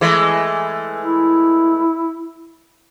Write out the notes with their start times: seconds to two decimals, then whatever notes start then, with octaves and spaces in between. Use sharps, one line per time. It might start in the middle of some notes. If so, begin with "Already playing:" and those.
0.01 E3 G#3 A3
1.02 E4